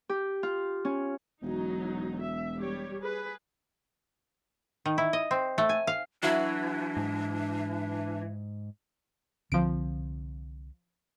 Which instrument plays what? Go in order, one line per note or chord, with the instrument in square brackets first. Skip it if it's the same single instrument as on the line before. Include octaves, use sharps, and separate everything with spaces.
[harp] G4
F4
C#4
[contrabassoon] E1 [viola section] F#3 D#4
[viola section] E5
G3 G4 C#5
G#4 B4
[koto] D#3
E4
D#5
C4
A3
G#5
F5
[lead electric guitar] E3 [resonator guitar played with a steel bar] F#3 E4 F#4 [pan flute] D4
[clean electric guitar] G#2
[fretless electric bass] C2 D3 C4 [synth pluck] F3 D7